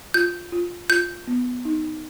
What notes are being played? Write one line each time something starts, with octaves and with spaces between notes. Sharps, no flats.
F4 G6
F4
F4 G6
B3
D#4